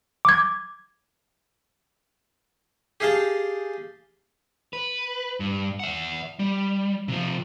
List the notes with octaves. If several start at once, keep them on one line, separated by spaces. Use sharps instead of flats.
D6 G#6
G4 G#4 F5 G5 A5
B4
G2
E5 F#5
G3
C3 F3